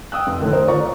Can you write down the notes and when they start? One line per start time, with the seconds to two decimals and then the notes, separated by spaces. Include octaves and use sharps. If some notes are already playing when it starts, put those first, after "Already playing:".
0.12 G5 D#6 E6 F#6
0.27 F1
0.40 A2 D3 D#3
0.52 A#4 C5
0.68 F4 D5 A#5 C#6